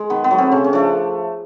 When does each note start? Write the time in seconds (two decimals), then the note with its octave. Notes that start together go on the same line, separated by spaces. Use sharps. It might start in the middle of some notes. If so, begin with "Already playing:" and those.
Already playing: G#3
0.10 D#3 B3
0.24 B3
0.31 F#3 A3
0.38 C4
0.51 C#3 C#4
0.64 C#4
0.73 F3 A3 D4